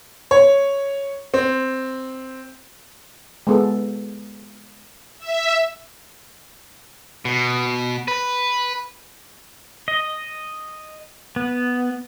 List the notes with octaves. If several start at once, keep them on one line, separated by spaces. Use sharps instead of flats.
C#5
C4
G#3 B3 A4
E5
B2
B4
D#5
B3